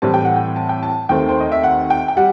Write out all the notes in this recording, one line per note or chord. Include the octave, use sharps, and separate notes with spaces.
A2 E3 G3 C4 A5
G5
F#5
G5
A5
G5
A5
D#2 D#3 A3 C4 G5
C5
D#5
E5
F#5
G5
G5
G3 F#5